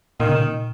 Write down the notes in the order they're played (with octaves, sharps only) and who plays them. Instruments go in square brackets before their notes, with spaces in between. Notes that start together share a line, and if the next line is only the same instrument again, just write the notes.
[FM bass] A#2 [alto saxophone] D#3
[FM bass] C#3
A#2